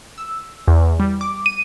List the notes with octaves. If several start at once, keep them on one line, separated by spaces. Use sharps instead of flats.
E6
E2
G3
D6
D#7